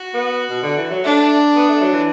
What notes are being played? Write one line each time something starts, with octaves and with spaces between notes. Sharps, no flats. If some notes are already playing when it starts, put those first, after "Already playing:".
Already playing: F#4
B3
B2
D3
E3
F#3
A3 D4
B3
A3
F#3
E3